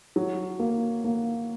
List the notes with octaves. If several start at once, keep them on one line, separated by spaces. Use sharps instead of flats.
F#3
A#3
A#3